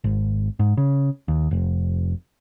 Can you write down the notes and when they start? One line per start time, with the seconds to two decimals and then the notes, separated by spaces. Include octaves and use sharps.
0.04 G#1
0.59 G#2
0.77 C#3
1.28 D#2
1.51 F1